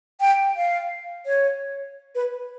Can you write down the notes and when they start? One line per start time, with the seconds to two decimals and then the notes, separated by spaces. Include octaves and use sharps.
0.20 G5
0.56 F5
1.26 C#5
2.15 B4